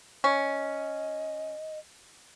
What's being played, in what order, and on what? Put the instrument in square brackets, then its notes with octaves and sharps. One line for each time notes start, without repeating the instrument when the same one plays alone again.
[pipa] C#4 [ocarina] D#5